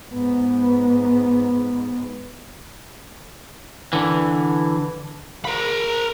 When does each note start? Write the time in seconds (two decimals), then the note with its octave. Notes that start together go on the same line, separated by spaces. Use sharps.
0.12 G#2 B3
3.93 D3 E3
5.45 A#4 B5